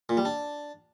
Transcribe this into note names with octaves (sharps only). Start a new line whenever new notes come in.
A#2
G3
D4